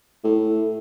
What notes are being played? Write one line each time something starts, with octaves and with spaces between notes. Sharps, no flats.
A2